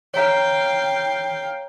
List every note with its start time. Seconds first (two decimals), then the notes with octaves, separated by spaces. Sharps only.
0.14 C#5 F5 G5 A#5